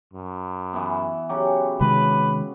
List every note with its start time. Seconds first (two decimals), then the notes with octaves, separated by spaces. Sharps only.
0.13 F#2
0.73 E3 B3
1.29 C#3 F#3 G4
1.81 C3 D#3 G#3 B4